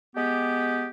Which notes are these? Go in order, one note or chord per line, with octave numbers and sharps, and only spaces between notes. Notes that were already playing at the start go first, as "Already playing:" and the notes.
G#3 B3 G4